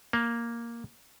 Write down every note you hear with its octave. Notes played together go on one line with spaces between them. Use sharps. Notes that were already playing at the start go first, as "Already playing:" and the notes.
A#3